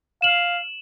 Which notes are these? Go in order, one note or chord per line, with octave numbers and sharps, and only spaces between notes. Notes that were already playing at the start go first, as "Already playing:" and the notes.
F5 E7 F#7